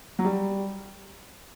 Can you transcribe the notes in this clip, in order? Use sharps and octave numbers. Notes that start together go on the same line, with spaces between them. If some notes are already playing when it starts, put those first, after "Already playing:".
F#3
G3